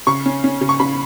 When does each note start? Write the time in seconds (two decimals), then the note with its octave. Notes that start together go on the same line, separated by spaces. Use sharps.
0.07 C#3 C#6
0.26 C#4
0.44 C#4
0.61 C#3
0.69 C#6
0.80 C#3 B5